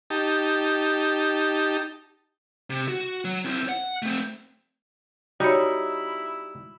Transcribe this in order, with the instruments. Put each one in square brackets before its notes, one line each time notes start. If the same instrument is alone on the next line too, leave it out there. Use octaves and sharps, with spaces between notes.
[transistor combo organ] D#4 G4 A5
[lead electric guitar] C3
F#4
F#3
C4 E4
F#5
A3 C4
[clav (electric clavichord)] G3 D#4 [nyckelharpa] E4 [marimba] F#4 C#5